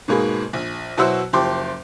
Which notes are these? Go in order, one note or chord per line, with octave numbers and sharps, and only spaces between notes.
G#2 B2 A#3 G#4 B5
A#1
B2 F#3 E4 F#4 C5 E6
F#1 F3 G4 C6 D6